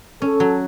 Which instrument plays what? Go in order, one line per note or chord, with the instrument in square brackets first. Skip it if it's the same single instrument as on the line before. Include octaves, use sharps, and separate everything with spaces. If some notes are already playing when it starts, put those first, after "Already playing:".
[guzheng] C#4 [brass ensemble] A4
[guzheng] F#3